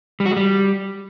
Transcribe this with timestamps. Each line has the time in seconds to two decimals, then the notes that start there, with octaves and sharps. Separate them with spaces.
0.20 G3
0.26 F#4
0.31 G#3
0.37 G3